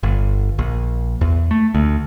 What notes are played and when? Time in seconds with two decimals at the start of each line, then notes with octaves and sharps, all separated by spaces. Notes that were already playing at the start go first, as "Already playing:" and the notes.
0.03 G1
0.59 A#1
1.21 E2
1.51 A3
1.75 D2